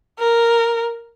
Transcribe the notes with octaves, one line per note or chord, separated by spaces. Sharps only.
A#4